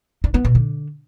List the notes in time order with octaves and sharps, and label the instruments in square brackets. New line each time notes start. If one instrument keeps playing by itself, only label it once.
[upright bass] D4
B3
B2
D3